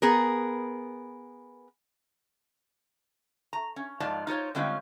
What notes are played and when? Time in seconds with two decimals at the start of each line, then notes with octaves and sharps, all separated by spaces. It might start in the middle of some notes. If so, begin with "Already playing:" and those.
0.02 B3 G#4 A#4
3.53 A#5
3.76 C#4
4.00 G#2 F3 F4 D5 A5
4.27 D#4 F4 C5 C#5
4.55 D3 G3 G#3 C4 C#4 F4